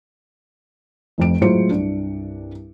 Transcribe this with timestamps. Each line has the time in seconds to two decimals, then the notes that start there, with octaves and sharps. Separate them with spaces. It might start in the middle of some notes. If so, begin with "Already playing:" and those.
1.18 F1 F2 D7
1.41 A2 F#3 G#3 F4 C5 C#7
1.71 C2 G2 D4